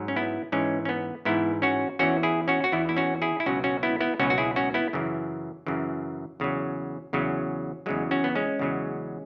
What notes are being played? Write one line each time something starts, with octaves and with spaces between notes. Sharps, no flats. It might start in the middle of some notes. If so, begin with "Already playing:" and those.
Already playing: G#2 F#3
C#4
B3 E4
G#2 E3 G#3 C#4
C#4
B3
G#2 E3 B3 E4
C#4 F#4
E2 E3 C#4 F#4
E4 G#4
C#4 F#4
F#4
E2 E3 B3 E4
E4
C#4 F#4
E4 G#4
E4
C#2 B2 F#3 C#4 F#4
C#4 F#4
B3 E4
B3 E4
C#2 B2 F#3 C#4 F#4
F#4
E4 G#4
C#4 F#4
B3 E4
F#2 C#3 E3
F#2 C#3 E3
E2 C#3 F#3
E2 C#3 F#3
E2 C#3 F#3 G#3
C#4 F#4
B3
G#3 C#4
E2 C#3 F#3